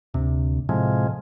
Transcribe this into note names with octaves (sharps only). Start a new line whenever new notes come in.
D2 C3
A2 C3 F3 G#3